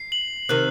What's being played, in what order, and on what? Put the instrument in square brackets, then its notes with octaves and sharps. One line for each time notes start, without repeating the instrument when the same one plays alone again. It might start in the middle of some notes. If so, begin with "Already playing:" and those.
Already playing: [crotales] C7
F#7
[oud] C3 D#3 [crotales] F#6